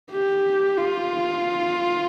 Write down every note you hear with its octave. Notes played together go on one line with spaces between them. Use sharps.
G4
F4